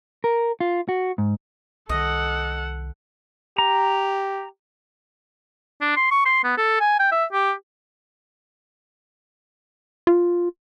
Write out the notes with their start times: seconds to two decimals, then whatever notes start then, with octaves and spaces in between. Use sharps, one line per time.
0.24 A#4
0.60 F4
0.89 F#4
1.18 G#2
1.89 C2 D#3 A4 D#5 F#5
3.58 G4 A#5
5.81 D4
5.96 C6
6.11 C#6
6.25 C6
6.44 B3
6.57 A4
6.80 G#5
6.99 G5
7.12 E5
7.33 G4
10.07 F4